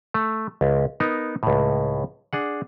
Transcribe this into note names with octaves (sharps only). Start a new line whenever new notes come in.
A3
C#2
B3 D#4 A#4
C#2 A2
D4 G#4 F#5